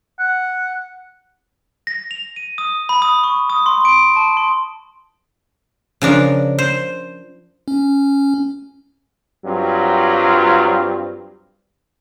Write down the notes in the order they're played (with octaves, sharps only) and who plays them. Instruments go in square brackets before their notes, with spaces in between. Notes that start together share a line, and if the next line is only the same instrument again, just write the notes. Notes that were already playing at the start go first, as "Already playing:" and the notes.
[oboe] F#5
[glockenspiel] A#6
F7
D#7
D#6
B5
D#6
C#6
D#6
C6
D7
A5
C6
[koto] C#3 F3 D4 A#4
C5
[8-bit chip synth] C#4
[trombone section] G2 F#3 C4 F4